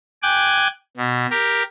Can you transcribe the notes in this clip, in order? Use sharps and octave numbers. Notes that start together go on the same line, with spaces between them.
G5 G#5 D6 F#6
B2
G4 A#4